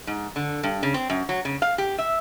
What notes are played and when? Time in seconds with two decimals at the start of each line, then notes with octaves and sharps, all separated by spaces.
0.07 G#2
0.36 D3
0.63 G2
0.83 C#3
0.94 C4
1.10 F#2
1.29 F#3
1.45 C#3
1.62 F5
1.78 G4
1.98 E5